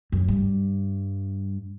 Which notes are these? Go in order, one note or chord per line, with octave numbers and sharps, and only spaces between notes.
F#2
G2